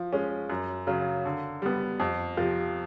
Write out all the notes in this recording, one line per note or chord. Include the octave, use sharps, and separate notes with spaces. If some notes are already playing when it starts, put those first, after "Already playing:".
Already playing: F3
G#3 C#4
F#2
C#3 F#3
D3
G3 B3
F2
C3 F3